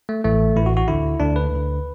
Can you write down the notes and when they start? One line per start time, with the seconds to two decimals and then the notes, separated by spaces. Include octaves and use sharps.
0.09 A3
0.24 A1 A2 E3 A3
0.56 A1 A2 E3 E4
0.66 F#4
0.77 F#4
0.88 D2 D3 E4
1.20 D2 D3 D4
1.36 B4
1.52 D2 D3